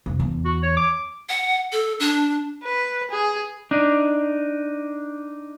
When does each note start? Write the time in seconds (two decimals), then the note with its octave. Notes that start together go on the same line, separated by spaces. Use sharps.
0.06 F1
0.20 E2
0.45 F#4
0.63 C#5
0.77 D6
1.29 F#5
1.72 A4
2.00 D4
2.63 B4
3.11 G#4
3.71 D4 D#4